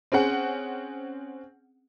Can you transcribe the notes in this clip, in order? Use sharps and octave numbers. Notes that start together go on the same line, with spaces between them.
C4 C#4 G#4 F#5